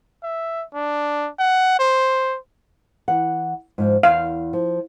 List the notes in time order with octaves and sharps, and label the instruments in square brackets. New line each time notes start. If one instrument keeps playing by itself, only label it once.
[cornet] E5
D4
F#5
C5
[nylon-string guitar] E3 F#5
G#2 F3
[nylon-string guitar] E2 [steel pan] F5
[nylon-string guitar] F3